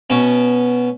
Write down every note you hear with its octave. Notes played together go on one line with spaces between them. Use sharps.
B2 C#4